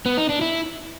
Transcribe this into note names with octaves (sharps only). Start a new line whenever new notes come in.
B3
D#4
D4
E4